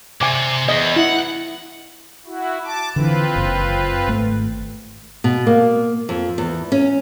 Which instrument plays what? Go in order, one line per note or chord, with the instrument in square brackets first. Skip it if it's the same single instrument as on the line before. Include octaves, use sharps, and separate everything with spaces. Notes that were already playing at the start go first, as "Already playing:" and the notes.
[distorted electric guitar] C3 [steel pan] G#5 D6
[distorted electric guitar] E2 [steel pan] D#5
[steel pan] E4 [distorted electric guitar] F#5
[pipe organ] E4 F#4
A5 D6
[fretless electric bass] D3 E3 [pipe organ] C4 F4 B4
[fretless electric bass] F#1
G#1 A3
[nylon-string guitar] B2
A#3
F2
E2
C#4